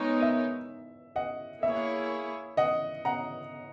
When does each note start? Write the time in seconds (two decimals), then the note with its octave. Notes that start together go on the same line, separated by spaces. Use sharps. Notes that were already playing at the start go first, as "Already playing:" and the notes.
Already playing: G#3 B3 D#4 A#4 C#5
0.22 E5
1.16 D#5 F#5
1.63 A#3 E4 G#4 C#5 E5
2.57 D#5 F#5
3.05 F#5 A#5